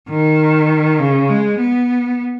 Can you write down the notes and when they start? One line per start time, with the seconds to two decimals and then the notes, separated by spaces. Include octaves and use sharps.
0.09 D#3
1.00 C#3
1.29 G#3
1.59 B3